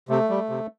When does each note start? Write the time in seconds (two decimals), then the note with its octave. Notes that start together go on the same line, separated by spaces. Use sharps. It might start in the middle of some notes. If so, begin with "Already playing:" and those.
0.09 C3 A3
0.30 G3
0.49 C3